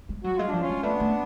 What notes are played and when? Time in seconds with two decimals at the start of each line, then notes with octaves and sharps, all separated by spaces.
0.09 G#3
0.24 F#3 F#4
0.37 G#3 F4
0.49 F3 D4
0.62 C#4 F4
0.69 G#3
0.83 A3 B3 D4
1.00 A3